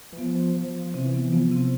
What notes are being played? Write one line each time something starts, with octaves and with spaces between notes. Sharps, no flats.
E3
F3 B3
F3
F3
C3 E3 C4
B3
F3 B3
C3 C4